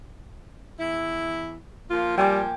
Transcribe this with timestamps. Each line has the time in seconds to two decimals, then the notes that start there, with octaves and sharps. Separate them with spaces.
0.79 E2 E4
1.90 F3 A#3 F4
2.18 G3 G5 G#5 D6